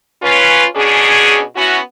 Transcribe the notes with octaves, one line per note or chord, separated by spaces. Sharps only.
C#4 F4 B4
B2 C#4 D4 G#4
B3 C#4 E4 F#4